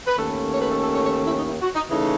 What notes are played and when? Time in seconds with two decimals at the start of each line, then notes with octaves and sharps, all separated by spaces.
0.07 B4
0.17 D#2 D#3 A3 C#4 A4
0.52 C#5
0.60 B4
0.70 A4
0.81 A4
0.93 C#5
1.04 C#5
1.25 E4
1.35 D#4
1.46 E4
1.62 F#4
1.76 D#4
1.90 C#3 E3 A3 D#4 E4